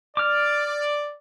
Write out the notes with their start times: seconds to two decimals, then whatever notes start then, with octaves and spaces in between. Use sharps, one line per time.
0.17 D5 D6 F6